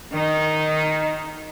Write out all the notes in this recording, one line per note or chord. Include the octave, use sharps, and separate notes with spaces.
D#3 D#4